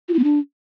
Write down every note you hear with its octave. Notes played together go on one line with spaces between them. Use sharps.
F4
E4
B3
D4